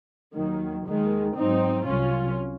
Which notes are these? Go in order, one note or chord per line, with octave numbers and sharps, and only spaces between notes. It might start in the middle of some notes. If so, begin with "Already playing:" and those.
D#2 D#3 F#3
D#2 D#3 G#3
G#2 F#3 C4 D#4
C2 C3 F#3 C#4 F4